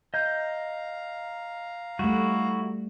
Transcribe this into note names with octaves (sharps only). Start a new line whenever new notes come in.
D#5 F5 A#5 G6
G3 A3 E4 F#4